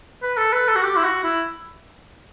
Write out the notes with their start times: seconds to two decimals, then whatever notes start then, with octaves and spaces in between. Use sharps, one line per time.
0.23 B4
0.37 A4
0.53 B4
0.68 A4
0.75 F#4
0.83 G4
0.96 E4
1.04 F#4
1.23 E4